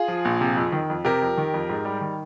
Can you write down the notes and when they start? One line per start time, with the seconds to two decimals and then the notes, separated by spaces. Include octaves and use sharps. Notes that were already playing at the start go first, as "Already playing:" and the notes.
Already playing: F4 G#4
0.08 F3
0.25 A#1
0.41 C3
0.57 F2
0.72 D#3
0.90 F2
1.05 C3 G4 A#4
1.22 F2
1.38 D#3
1.54 F2
1.69 G#2
1.85 G3
2.01 D#3